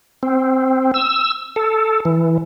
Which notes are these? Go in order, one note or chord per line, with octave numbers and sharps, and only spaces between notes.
C4
E6
A4
E3